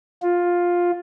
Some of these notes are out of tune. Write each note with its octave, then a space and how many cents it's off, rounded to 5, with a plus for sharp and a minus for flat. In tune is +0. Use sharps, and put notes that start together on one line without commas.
F4 +10